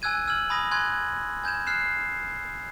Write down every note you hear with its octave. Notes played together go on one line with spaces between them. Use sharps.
G#5 E6 F#6 G#6 D#7
E6 F6 G#6 F#7
G#5 B5 D#6 A#6
G#5 C6 F#6 G#6
G#5 G6 G#6 E7
F6 F#6 C7 E7